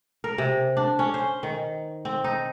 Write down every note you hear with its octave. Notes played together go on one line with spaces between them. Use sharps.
A#4
C3
D4
C#4
C5
D#3
C4
D#4